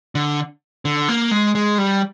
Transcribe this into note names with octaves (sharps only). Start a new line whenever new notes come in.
D3
D3
A#3
G#3
G#3
G3